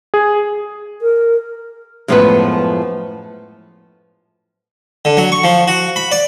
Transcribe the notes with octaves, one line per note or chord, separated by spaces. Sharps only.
G#4
A#4
F#2 A2 F3 G#3 B3 B4
D3
F#3
C#6
F3
F#4
B5
D5